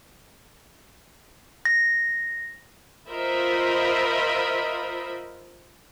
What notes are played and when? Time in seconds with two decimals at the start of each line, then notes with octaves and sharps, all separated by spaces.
1.65 A#6
3.09 F4 A#4 C5 D#5 E5 B5